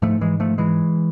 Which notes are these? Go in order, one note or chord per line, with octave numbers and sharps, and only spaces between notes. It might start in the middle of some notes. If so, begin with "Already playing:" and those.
G#2 F3 A3
E3 G#3
F3 A3
E3 G#3